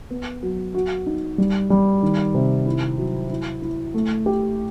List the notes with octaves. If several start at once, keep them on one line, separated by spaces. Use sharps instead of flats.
B3
F#3
F#4
D#4
G3
G3
D#3
C3
E4
F#3
E4
E4
A3
G4